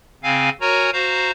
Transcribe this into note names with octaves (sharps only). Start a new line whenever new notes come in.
C#3 C4 F5 G#5
F#4 A#4 C#5 G#5 A#5
F#4 C5 F5 A#5